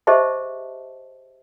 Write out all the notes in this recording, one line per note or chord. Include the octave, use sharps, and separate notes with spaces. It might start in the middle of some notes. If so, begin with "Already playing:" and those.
G4 G#4 C5 D#5 E5 A5